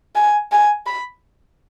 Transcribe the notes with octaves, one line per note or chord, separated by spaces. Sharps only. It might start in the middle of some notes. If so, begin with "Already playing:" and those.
G#5
G#5
B5